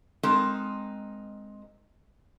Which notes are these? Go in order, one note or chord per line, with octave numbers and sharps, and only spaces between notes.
G#3 C4 D#4 A#4